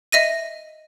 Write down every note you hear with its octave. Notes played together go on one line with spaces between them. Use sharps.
D#5 E5 A#6 D#7